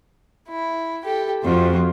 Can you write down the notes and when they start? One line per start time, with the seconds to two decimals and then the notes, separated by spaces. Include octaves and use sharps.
0.49 E4
1.05 G4 A4
1.43 F2 F4 F#4